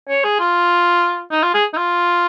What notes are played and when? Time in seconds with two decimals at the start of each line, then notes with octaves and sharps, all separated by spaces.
0.09 C#5
0.24 G#4
0.39 F4
1.31 D#4
1.43 F4
1.54 G#4
1.73 D#4
1.77 F4